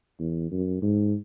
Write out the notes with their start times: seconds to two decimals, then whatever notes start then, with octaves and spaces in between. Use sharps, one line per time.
0.20 E2
0.52 F#2
0.82 G#2